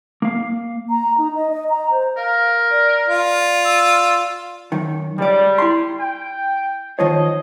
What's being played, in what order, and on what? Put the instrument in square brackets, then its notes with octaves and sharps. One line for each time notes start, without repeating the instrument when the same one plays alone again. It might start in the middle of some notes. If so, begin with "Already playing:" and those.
[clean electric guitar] A#3 F5
[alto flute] A#5
D#4
D#5
D#5
A#5
C5
[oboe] A#4 [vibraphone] F5
[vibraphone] D5
[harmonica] F4
[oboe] E6
[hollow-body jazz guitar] F#2 D#3
[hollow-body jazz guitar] C#2 D5 [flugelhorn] G3
[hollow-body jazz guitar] E4 C6
[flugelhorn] G5
[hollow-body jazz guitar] D#3 F3 C#5 [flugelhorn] D#5